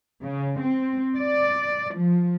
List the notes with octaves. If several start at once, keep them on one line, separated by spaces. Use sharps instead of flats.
C#3
C4
D5
F3